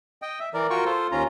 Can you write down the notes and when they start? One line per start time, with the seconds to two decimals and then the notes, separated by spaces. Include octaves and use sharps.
0.22 D#5 G5
0.40 E5
0.54 E3 A#4 D5
0.70 F4 F#4 A#4 G5 C#6
0.86 F4 A4 C5
1.12 D#2 C#4 F4 A#5